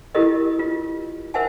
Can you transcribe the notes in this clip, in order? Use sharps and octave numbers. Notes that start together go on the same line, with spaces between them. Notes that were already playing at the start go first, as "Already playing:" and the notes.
E4 F4 G4 A4 A#4 D#5
F4
A#4 C5 E5 F#5 G#5 A5